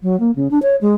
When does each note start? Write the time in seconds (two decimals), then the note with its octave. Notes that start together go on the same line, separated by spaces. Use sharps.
0.03 F#3
0.20 A#3
0.36 C#3
0.51 D4
0.62 C#5
0.81 G#3